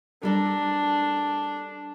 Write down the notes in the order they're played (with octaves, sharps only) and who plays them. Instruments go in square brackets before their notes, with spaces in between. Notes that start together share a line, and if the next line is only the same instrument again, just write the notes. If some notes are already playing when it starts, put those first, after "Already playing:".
[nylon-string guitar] G3 A4 A#4 [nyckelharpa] D4